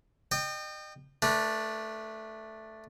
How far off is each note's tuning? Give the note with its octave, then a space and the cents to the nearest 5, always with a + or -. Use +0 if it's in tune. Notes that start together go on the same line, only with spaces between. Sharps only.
D#5 -40 G5 +0
A3 +0 D4 +0 B4 -40